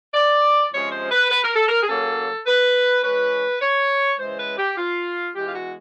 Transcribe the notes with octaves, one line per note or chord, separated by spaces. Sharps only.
D5
C3 F3 G#3 C#4 C#5
C5
B4
B4
A#4
A4
A#4
G#4
C#3 F#3 A#3 C#4 A4
B4
E3 G#3 C#4 B4
C#5
C#3 E3 G#3 C5
B4
G4
F4
E3 G#3 B3 G4
F4
F#4